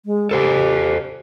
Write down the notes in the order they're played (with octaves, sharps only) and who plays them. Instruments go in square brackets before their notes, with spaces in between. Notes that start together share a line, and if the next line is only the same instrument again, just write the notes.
[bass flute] G#3
[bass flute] G4 [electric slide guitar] A4 C5 G#5